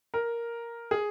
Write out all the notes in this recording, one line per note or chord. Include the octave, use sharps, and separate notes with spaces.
A#4
G#4